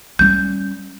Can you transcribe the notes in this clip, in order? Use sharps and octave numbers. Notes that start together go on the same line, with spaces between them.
G3 C#4 G6